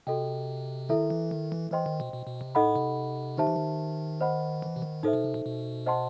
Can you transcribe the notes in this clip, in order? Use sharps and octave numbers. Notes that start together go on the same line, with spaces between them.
C3 F#4 A4 D#5 G5
D#3 E4 A4 E5
E3
D#3
E3
E3 C5 D#5 G5 C6
D#3
B2
B2
B2
C3
A2 D#4 A4 D#5 F#5 B5
C3
D#3 D#4 G4 C5 E5 A5
E3
D#3
C5 D#5 F#5 B5
E3
C3
D#3
A2 D#4 A4 C5 E5
B2
C3
B2
B2
C5 D#5 F#5 A5 C6